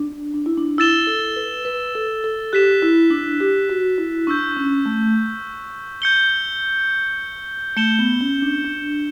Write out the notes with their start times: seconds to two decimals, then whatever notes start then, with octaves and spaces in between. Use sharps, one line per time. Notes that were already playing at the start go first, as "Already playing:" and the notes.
Already playing: D4
0.34 D4
0.46 E4
0.58 D4
0.78 E4 E6 A6 E7 G7
1.07 A4
1.36 B4
1.65 B4
1.95 A4
2.24 A4
2.53 G4 F#6 B6 E7
2.82 E4
3.11 D4
3.40 G4
3.70 F#4
3.98 E4
4.27 D4 C#6 E6 G6
4.57 C#4
4.86 A3
6.02 G6 C#7 G7
7.76 A3 G6 C#7 E7 G7
7.99 B3
8.21 C#4
8.42 D4
8.64 D4